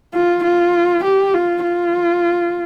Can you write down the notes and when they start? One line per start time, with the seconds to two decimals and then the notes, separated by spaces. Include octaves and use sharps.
0.14 F4
0.44 F4
1.04 G4
1.34 F4
1.63 F4